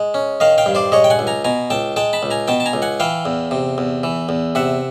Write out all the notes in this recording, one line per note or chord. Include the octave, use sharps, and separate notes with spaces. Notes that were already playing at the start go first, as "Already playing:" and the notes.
Already playing: G#3
C#4
D#3 D#5 F5
F5 G5
G2
C5 D5
G#3 C#5 D#5
G5
F#5 G#5
C#2
G#5 A#5
B2 G#5 A#5
C#2 G5 A5
G#3 G5 A5
A5 B5
C#2
G#5 A#5
B2 G5 A5
A5
G#5 A#5
C#2
F#5 G#5
E3 F5 G5
E2
C3
E2
E3
E2
C3 E5 F#5